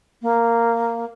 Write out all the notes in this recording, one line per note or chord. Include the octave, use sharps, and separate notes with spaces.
A#3